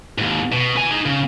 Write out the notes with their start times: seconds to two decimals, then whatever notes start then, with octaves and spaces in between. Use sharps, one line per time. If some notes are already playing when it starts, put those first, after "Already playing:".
0.18 D#2 G#2
0.52 B2
0.76 B4 G#5
0.91 D#4 G#4
1.05 C#3